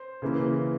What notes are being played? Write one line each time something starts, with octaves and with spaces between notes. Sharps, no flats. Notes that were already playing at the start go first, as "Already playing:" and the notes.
Already playing: C5
C#3 E3 A#3